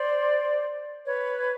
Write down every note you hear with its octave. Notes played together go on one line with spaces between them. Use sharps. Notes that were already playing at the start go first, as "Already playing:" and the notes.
Already playing: C5 D5
B4 C#5